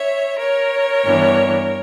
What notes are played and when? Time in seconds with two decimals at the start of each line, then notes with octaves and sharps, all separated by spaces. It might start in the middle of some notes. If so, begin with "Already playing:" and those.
Already playing: C#5 E5
0.38 A#4 C#5
1.04 G2 E3 B3 D4